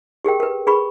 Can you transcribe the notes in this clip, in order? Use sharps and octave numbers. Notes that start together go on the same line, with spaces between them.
G4 G#4 A#4 G5
A#4 B4
G#4 B4 B5 C#6